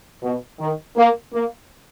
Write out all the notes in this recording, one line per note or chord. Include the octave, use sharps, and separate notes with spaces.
B2
D#3
A#3
A#3